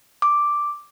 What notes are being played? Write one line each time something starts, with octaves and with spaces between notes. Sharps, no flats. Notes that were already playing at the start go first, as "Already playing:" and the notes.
D6